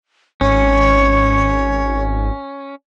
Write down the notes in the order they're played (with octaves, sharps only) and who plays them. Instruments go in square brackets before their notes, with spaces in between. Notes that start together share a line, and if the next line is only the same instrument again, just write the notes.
[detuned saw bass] G#1 [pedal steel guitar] C#4 [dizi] C#5